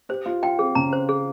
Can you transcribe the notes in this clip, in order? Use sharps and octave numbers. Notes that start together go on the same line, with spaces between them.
G4 C5
F4 C5
F4 G5
C4 G#4
C#3 A#5
C5
G#4